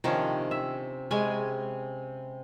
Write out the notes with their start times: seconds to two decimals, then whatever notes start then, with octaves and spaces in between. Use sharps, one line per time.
0.04 C3 D#3 F3 C#4 D4 G4
0.51 E5
1.11 C3 G#3 C#4 B4 G#5